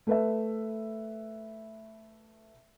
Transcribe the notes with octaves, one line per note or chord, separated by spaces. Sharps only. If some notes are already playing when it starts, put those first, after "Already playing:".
A3 B4 E5